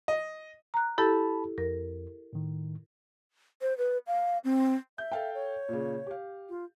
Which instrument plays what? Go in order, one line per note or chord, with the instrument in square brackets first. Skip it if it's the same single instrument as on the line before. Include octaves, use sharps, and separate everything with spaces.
[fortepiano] D#5
[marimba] A#5 F#6
[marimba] E4 G4 A4 [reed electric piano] A5 B5
[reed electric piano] F2 [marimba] A#4
[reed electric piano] A2 D#3
[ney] C5
B4
F5
C4
[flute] E5 [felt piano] G6
[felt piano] A4 F5 G5
[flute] C#5
[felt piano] A#2 C#3
G4 F5
[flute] F4